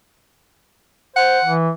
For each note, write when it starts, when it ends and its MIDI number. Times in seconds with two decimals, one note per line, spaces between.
1.16 1.38 72
1.16 1.53 78
1.45 1.70 52